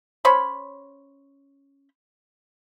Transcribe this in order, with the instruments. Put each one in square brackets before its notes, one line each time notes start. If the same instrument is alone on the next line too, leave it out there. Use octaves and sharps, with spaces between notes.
[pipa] C#4 C5 C#5 B5